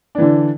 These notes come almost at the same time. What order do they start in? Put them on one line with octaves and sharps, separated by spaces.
D4 E3 D3